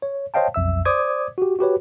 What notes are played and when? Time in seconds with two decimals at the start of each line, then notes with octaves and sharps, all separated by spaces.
0.02 C#5
0.34 C5 C#5 D#5 F5 G5 A5
0.54 B1 F2 E5 E6
0.85 C5 D5 D6 D#6 G#6
1.38 F#4 G4
1.59 F#4 G4 B4 C#5